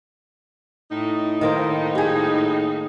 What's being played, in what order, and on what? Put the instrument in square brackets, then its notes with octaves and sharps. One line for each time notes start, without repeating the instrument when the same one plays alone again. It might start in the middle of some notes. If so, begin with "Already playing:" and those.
[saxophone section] A2 D#4
[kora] D#3 A#3 C5
G4 G#4